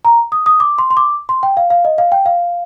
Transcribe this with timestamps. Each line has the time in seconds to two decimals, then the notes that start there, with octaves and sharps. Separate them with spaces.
0.05 A#5
0.32 D#6
0.46 D#6
0.60 D6
0.78 C6
0.91 C6
0.97 D6
1.29 C6
1.43 G5
1.57 F5
1.70 F5
1.85 D#5
1.98 F5
2.12 G5
2.26 F5